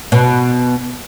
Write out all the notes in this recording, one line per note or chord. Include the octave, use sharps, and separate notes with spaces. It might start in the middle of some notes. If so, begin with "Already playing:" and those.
B2